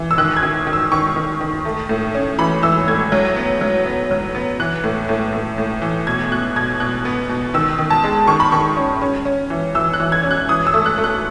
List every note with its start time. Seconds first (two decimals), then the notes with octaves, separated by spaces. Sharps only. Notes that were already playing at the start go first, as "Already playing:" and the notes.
Already playing: E3
0.11 E6
0.18 D#3 F#6
0.37 G#6
0.43 D#3
0.67 D#3
0.73 E6
0.92 D#3 C#6
1.16 D#3
1.41 D#3
1.65 A3
1.89 A2
2.15 C#4
2.38 E3 B5
2.63 E3 E6
2.88 A2 G#6
3.12 F#3
3.36 B3
3.61 F#3
3.86 B3
4.11 F#3
4.35 B3
4.60 E3 F#6
4.84 A2
5.09 A2
5.33 A2
5.58 A2
5.82 E3
6.07 B2 G#6
6.31 B2 F#6
6.56 B2 G#6
6.80 B2 F#6
7.05 B3
7.29 B2
7.54 D#3 E6
7.78 D#3
7.90 A5
8.04 G#3
8.27 D#3 C#6
8.40 B5
8.52 D#3 C#6
8.77 C#4
9.02 C#4
9.25 C#4
9.50 E3
9.75 E3 E6
9.93 F#6
10.00 E3
10.12 G#6
10.23 C#4
10.31 F#6
10.49 E3 D#6
10.67 E6
10.74 A3
10.86 F#6
10.98 A3
11.04 F#6